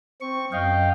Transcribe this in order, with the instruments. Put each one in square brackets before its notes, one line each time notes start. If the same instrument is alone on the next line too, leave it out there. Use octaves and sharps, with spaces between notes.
[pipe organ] C4 C#6
F#2 D#5 F5 G5